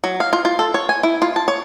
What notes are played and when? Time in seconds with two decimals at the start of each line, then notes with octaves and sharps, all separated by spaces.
0.04 F#3
0.20 F5
0.33 F4
0.45 F4
0.59 A4
0.74 C#5
0.89 G#5
1.03 E4
1.22 F4
1.36 A5
1.48 C#5